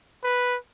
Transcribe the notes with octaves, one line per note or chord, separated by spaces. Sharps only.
B4